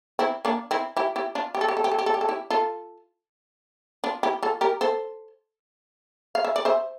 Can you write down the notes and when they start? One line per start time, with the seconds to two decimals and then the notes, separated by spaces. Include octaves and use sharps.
0.19 C4 E4
0.45 A#3 D4
0.71 C4 E4
0.97 E4 G4
1.16 E4 G4
1.35 D4 F4
1.55 G4
1.61 A4
1.68 G4
1.77 A4
1.84 G4
1.91 A4
1.99 G4
2.06 A4
2.14 G4
2.21 A4
2.29 E4 G4
2.50 F4 A4
4.04 D4 F4
4.23 E4 G4
4.42 F4 A4
4.61 G4 A#4
4.81 A4 C5
6.35 F5
6.44 E5
6.56 D5
6.65 C5 E5